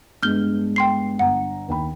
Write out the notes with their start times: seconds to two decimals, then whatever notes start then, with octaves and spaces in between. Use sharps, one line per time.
0.23 G2 G#3 B3 F6 G6 G7
0.76 G5 C6 C7
1.19 G1 F#5 A#5
1.68 D#2 G5 B5